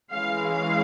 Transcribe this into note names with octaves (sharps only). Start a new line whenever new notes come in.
E3 G#3 C#4 F5
F5